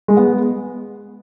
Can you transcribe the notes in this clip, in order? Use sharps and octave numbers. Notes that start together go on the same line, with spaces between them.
G#3
B3